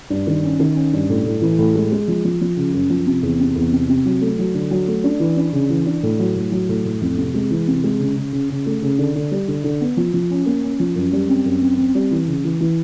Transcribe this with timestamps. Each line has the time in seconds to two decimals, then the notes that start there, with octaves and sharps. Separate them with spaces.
0.10 G2
0.27 D#3
0.43 C#4
0.60 D#3
0.76 C#4
0.93 G2
1.10 A2
1.26 A2
1.42 E3
1.59 A2
1.75 G#3
1.92 G#3
2.08 F3
2.25 F3
2.41 F3
2.57 C#3
2.74 F#2
2.90 F3
3.06 C3
3.23 E2
3.40 C3
3.56 E2
3.72 C3
3.89 C3
4.05 F#3
4.21 A3
4.39 F#3
4.54 D3
4.71 F#3
4.88 A3
5.04 D4
5.20 E3
5.37 D4
5.53 C#3
5.70 E3
5.86 D4
6.03 A2
6.19 F#3
6.36 A2
6.52 F#3
6.69 A2
6.85 A2
7.01 F2
7.17 C3
7.34 G#3
7.50 E3
7.67 C3
7.84 G#3
8.00 C#3
8.16 C#3
8.33 C#3
8.50 C#3
8.66 A3
8.82 C#3
8.98 D3
9.15 D3
9.31 G3
9.48 D3
9.64 D3
9.81 B3
9.97 F3
10.14 F3
10.30 C#4
10.46 A#3
10.63 C#4
10.80 F3
10.96 F#2
11.13 G3
11.29 C4
11.45 F#2
11.62 C4
11.78 C4
11.95 G3
12.11 E3
12.28 C#3
12.44 E3
12.61 E3